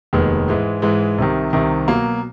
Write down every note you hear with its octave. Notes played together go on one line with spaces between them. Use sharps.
F1 D#2 D#3 G#3 B3
G#2 E3 G#3
G#2 E3 G#3
C2 C3 D#3
C2 C3 D#3
B2 F#3 A#3